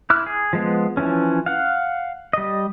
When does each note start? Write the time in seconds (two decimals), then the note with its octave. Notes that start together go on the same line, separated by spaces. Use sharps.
0.10 E4 D6 F6 F#6
0.26 G#4
0.53 F3 G#3 B3
0.97 E3 F3 C#4
1.46 F5 F#5
2.33 G3 D#5